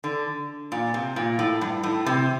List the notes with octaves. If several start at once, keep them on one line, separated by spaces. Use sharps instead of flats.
D3
A#2
C3
A#2
A2
G2
A2
C3